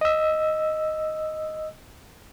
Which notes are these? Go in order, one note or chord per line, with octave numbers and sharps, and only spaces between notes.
D#5 E6